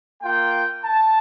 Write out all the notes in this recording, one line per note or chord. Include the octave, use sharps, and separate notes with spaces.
A#3 F4 G5
A5